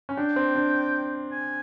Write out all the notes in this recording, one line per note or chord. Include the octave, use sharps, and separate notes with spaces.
C#4
D4 G5
C4
D4
G#5